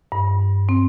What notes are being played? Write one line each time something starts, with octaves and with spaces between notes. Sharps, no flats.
G2
C4